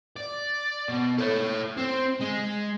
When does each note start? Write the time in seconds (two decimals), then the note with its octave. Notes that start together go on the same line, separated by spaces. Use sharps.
0.17 D5
0.89 B2
1.18 A4 C#5
1.77 C4
2.20 G#3